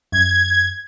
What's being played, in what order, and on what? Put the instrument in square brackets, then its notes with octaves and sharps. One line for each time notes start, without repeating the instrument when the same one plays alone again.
[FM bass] F#2 [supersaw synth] G#6